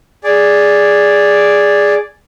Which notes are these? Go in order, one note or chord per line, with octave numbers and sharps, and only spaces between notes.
G#4 D5